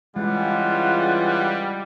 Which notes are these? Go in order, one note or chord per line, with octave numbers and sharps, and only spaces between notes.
C#3 E3 G3 G#3 F4 F#5